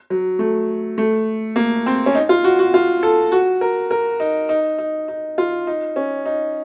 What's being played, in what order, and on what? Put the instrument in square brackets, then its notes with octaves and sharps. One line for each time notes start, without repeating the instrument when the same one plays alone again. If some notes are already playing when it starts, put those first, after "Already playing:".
[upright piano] F#3
A3
A3
A#3
C4
C#4
D#4
F4
F#4
F#4
F4
A4
F#4
A#4
A#4
D#4
D#4
D#4
D#4
F4
D#4
C#4
D#4